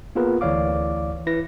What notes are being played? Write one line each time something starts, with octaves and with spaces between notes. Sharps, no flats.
A#3 B3 F4 G#4 A#4 B4
D2 E3 C#5 D5 F5 D6
E4 B4 A#6